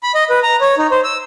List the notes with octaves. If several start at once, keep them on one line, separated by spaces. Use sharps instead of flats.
B5
D#5
B4
A#5
C#5
D#4
C5
E6